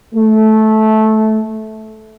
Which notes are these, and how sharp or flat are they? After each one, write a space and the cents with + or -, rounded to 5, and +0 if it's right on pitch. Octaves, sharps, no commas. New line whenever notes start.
A3 -15